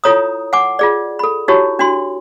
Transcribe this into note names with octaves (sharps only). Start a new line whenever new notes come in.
E4 F4 A4 C#5 A#5 D#6
F#5 G#5 D6
F4 G#4 D5
A4 B5
D#4 E4 F#4 G4 C#5
D4 F#4 C6